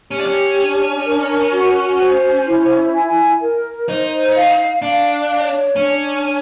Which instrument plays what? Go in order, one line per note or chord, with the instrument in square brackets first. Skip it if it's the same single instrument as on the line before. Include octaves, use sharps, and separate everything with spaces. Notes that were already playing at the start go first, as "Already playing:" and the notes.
[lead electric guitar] C#4 [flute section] G4
[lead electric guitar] D4
C#4
[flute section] D4
A#4
F#4
C5
E4
G#5
A#4
[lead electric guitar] D#4 [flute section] C5
[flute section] F5
[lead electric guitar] D4 [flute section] F5
[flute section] C#5
[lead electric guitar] C#4 [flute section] D4
[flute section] D4